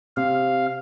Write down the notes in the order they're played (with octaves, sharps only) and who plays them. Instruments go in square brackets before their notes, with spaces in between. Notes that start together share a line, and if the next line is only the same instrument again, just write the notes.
[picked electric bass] C3 [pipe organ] F5